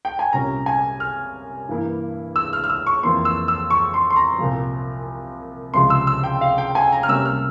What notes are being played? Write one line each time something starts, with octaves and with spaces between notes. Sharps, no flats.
G5
G#5
C2 A#2 G3 C#4 A#5
G#5
F6
G2 E3 A#3 E4
E6
F6
F6
E6
C#6
F2 E3 A#3 C6
E6
E6
C#6
C6
C6
A#5
C2 A#2 F3
C#2 C3 F3 G#3 C6
E6
E6
G5
F5
G5
G#5
A#5
F6
C3 G3 A#3 C#4 E6
F6